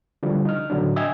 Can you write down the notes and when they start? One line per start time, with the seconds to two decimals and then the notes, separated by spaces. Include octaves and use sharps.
0.23 D3 F3 G3
0.45 D#4 F6
0.70 A2 D3 F#3 D4
0.96 D#5 E5 G5 G#5 E6 G#6